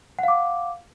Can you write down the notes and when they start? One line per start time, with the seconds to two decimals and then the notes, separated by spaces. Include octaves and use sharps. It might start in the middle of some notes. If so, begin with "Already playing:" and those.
0.19 F#5
0.23 F5
0.28 D6